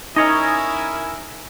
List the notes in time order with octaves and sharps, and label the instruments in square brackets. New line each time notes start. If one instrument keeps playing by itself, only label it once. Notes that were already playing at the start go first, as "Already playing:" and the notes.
[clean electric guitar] C#4 C#5 D#5 [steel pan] D#4 [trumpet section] E4 A#4 G#5